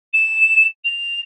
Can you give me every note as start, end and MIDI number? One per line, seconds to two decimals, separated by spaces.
0.13 0.64 100
0.84 1.19 101